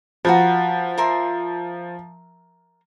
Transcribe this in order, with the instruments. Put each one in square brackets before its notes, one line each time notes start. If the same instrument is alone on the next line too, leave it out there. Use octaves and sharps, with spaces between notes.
[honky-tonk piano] F3 [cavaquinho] F#4 A#4 B4
[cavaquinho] A#4 E5 C6